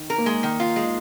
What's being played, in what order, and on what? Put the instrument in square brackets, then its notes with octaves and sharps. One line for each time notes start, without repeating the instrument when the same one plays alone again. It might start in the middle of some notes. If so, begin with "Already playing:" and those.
Already playing: [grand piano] D#3
[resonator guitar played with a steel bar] A#4
[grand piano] A#3
[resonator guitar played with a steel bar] G#3
D#3
F4
G#3